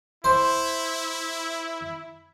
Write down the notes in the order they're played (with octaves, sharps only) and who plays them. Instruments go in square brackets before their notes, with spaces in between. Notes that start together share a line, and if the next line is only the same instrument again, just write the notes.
[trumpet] E4 [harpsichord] C5